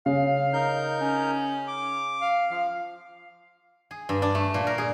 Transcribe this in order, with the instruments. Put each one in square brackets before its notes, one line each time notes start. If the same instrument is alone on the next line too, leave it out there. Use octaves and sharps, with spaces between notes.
[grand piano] C#3 [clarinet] F5
[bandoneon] D#4 A#4 G6
[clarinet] C#4
[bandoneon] D6
[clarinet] F5
[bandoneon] F3 [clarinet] F5
[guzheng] G#4
G2
D4
A3
A#2
A#4
G#4